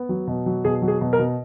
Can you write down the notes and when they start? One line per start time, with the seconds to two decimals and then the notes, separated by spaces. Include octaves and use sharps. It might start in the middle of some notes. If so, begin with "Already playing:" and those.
Already playing: B3
0.09 F#3
0.27 B2
0.46 F#3
0.65 B2 G#4
0.82 F#3
0.88 G#4
1.01 B2
1.13 A#4
1.19 B2